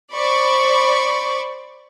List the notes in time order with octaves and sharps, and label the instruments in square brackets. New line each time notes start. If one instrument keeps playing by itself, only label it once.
[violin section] C5 D5 B5 C#6